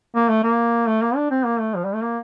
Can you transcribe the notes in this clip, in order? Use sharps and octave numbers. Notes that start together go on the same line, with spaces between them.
A#3
A3
A#3
A3
A#3
D4
C4
A#3
A3
F3
G3
A3
A#3